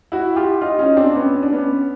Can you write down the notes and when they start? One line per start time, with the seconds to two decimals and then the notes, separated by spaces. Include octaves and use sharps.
0.12 E4 F#4
0.36 F4 G4
0.61 D#4 F4
0.79 C#4 D#4
0.97 C4 D4
1.16 B3 C#4
1.34 C#4
1.43 D4
1.52 B3 C#4